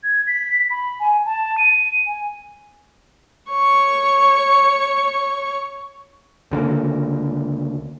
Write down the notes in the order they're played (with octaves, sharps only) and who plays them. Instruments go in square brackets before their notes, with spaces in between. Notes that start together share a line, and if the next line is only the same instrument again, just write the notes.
[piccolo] G#6
B6
B5
G#5
A5
D#7
G#5
[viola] C#5 C#6
[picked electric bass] C#2 D3 D#3 A#3